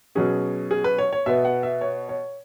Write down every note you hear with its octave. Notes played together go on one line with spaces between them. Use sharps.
B2 F#3 C#4 G#4
G#4
B4
C#5
C#5
B2 B3 E5
F#5
E5
C#5
C#5